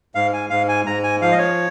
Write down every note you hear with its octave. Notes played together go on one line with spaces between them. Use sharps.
G#2 F5
G#5
G#2 F5
G#5
G#2 A#5
G#5
F3 F5
D#5
C#5